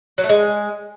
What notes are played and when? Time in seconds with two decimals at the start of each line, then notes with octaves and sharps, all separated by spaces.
0.18 F#3
0.24 A3
0.29 G#3